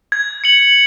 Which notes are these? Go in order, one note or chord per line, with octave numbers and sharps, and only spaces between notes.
G#6
C#7 F#7